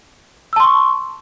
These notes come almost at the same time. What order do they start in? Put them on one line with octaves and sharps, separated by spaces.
E6 A5 C6 C#6